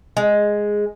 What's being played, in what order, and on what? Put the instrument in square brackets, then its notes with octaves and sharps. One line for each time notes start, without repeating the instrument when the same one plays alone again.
[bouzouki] G#3